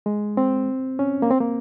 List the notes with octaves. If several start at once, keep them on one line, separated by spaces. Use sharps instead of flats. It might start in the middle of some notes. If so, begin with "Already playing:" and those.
G#3
C4
C#4
A#3
C4
A#3